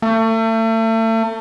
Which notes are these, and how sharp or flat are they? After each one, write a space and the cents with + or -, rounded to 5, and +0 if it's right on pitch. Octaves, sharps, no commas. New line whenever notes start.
A3 +35